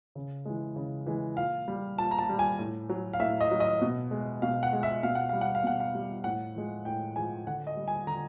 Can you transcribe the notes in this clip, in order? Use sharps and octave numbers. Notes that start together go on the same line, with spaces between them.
C#3
E3 G#3
C#3
E3 G#3
A#2 F5
G3
A#2 A5
A#5
A5
G3
G#5
A2
F#3
F5
A2 E5
D#5
F#3
D#5
B2
G#3
B2 F5
F#5
G#3
E5
B2 F5
F#5
G3 F5
F#5
F5
B2 F#5
F5
G3
A2 F#5
F3 G#3
A2 G5
F3 G#3 G#5
D3 F#5
D#5
G3
G#5
D3 A#5